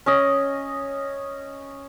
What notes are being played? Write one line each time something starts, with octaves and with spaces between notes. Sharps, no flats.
C#4 D#5